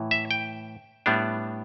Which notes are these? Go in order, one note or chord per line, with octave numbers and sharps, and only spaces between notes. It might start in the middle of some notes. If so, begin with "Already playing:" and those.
Already playing: A2 E3
E5
G5
A2 G3 B3 D4